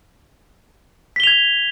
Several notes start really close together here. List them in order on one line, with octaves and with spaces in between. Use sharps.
B6 G7 F7 G#6